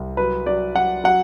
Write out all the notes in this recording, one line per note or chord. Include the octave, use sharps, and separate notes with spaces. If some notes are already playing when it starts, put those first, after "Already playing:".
Already playing: C2
F#3 B4
F#3 D5
F#3 F#5
F#3 F#5